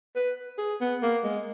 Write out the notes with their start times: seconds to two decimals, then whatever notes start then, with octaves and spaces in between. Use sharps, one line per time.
0.16 B4
0.58 G#4
0.81 B3
1.02 A#3
1.24 G#3